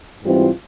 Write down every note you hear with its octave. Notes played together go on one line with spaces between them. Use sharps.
G#2 E3 G3 C4 F4